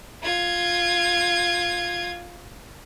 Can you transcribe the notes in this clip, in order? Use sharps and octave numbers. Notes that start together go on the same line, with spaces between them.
F4 G#6